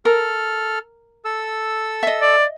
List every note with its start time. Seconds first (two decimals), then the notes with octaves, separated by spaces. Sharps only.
0.05 A4 A#4 F6
1.25 A4 E6
2.03 D#5 E5
2.21 D5